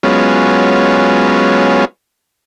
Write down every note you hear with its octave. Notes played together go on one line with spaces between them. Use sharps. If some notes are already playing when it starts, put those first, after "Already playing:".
F#3 G#3 B3 C#4 F4